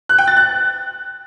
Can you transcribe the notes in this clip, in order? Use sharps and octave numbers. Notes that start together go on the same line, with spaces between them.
F#6
G5
A6
F#6